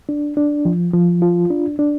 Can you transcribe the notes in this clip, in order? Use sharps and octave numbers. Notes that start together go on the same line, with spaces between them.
D4
D4
F3
F3
F4
D4
D4